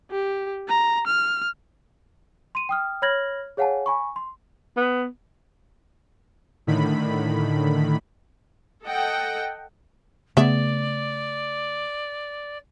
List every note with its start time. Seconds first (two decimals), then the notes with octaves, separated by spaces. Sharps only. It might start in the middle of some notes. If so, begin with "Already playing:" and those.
0.11 G4
0.68 A#5
1.07 F6
2.55 C6 D#7
2.69 G5 D#6 F6
3.02 C#5 B5 F6 G#6 A#6 F#7
3.57 G#4 C#5 F5 F#5 G#5 A5
3.86 G#5 B5 C#6
4.16 C6
4.76 B3
6.67 A2 D3 D#3 B5
8.86 A4 D#5 F#5 G5
10.37 C#3 A3 B3 G#4 D5 E5